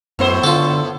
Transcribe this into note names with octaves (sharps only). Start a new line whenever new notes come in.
F#2 A2 B3 C5
D3 F4 A4